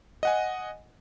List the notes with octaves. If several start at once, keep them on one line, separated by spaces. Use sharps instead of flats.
D#5 F#5 G#5